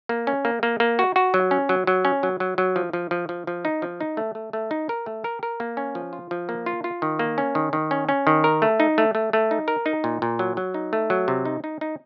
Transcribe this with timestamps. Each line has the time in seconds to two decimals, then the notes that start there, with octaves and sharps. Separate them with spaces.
0.09 A#3
0.27 C#4
0.45 A#3
0.63 A#3
0.80 A#3
0.99 F#4
1.16 F#4
1.34 F#3
1.51 C#4
1.69 F#3
1.87 F#3
2.05 C#4
2.23 F#3
2.40 F#3
2.58 F#3
2.76 F3
2.93 F3
3.11 F3
3.29 F3
3.47 F3
3.65 D#4
3.82 F3
4.00 D#4
4.17 A3
4.35 A3
4.53 A3
4.71 D#4
4.89 A#4
5.06 A3
5.24 A#4
5.43 A#4
5.60 A#3
5.77 C#4
5.95 F3
6.13 F4
6.31 F3
6.49 A#3
6.66 F4
6.84 F4
7.02 D#3
7.19 A#3
7.38 C#4
7.55 D#3
7.73 D#3
7.91 C#4
8.09 C#4
8.27 D#3
8.44 A#4
8.62 A3
8.80 D#4
8.98 A3
9.15 A3
9.33 A3
9.51 D#4
9.68 A#4
9.86 D#4
10.04 A#2
10.22 A#2
10.39 F#3
10.57 F#3
10.74 D#4
10.93 A3
11.10 F#3
11.28 C3
11.45 D#4
11.64 D#4
11.81 D#4